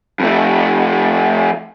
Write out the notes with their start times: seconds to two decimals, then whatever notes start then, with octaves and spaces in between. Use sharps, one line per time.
0.20 F2 A3